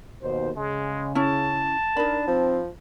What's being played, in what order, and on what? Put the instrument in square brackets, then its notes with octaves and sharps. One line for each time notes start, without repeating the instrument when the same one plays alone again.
[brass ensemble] D#2 B2 C5
[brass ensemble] C#3 [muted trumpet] G#3
[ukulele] C#4 E4 [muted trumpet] A5
[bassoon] D4 [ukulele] D#4 B5 [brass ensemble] A#4
[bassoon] F3 [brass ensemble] C4